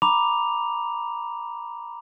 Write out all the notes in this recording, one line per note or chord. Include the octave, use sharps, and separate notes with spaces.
A#5 B5 D6 F7